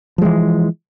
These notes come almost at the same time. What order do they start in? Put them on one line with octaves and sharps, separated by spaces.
F3 G#3 E3